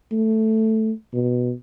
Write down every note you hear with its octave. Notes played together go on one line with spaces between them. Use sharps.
A3
B2